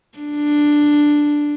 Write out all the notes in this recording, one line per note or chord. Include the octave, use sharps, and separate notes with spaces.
D4